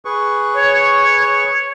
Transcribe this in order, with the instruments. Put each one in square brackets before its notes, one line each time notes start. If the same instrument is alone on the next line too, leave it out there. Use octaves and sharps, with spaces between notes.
[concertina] G#4 B4 C#6
[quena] C#5